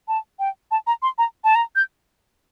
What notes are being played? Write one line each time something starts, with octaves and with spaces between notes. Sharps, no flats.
A5
G5
A5
A#5
C6
A#5
A5
A#5
G6